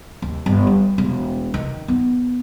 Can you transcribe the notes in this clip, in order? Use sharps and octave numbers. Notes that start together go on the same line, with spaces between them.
D#2
G1
G3
E1
D#3
B3